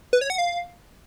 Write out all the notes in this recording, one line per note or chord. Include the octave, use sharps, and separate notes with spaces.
B4
C#5
F#5
F5